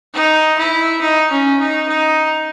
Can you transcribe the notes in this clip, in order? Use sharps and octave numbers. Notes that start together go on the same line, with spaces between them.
D#4
E4
D#4
C#4
D#4
D#4